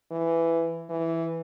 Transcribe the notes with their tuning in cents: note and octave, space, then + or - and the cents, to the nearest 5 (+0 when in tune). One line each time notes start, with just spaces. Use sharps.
E3 +10
E3 +0